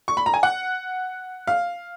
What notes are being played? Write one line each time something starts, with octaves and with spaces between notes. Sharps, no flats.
C#6
B5
A#5
G#5
F#5
F5